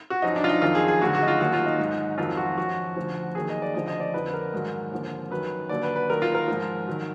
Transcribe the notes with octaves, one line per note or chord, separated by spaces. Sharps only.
F#4
F#2 F3 D#4
D4
F4
D#4
F2 D#3 F#3 F4
G#4
G#4
D2 D3 F#3 F#4
F#4
D#4
F4
D#2 D#3 F#3 F#4
F4
D#4
G#2 F#3
F2 D#3 F#3 F4
F#4
F#2 F3 F#4
D2 D3 F3
D#2 D#3 F#3 G#4
D#5
D5
D2 D3 F3 D#5
D#5
D5
F2 D3 F3 B4
A#4
G#2 D#3 F#3
D#2 D3 F3
F#2 D#3 F#3 B4
D#2 D3 F#3 D5
B4
B4
D#2 D#3 F#3 A#4
F4
A#4
G#2 F3
D#3 F#3